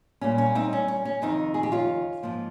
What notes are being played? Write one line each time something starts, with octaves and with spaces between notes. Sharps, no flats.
A#2 G3 A#3 C#4
C#4
C4 D#4
C#4
C#4
C#4
F2 C3 D#3 C4 D#4
G#4
G4
C#4 F4
G#2 F3 A#3